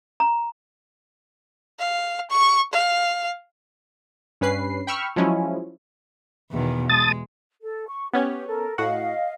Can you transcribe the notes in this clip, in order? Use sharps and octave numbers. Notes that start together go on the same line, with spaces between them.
A#5
F5
C#6
F5
G2 C#4 B4 C7
G5 B5 C#6 E6 F6
F3 F#3 G#3 C#4 E4
E2 B2 D#3
G#3 A5 D#6 A6
A4
C#6
B3 C#4 G4 C#5
A4 A#4
A2 F#4 D#5 F5 F#5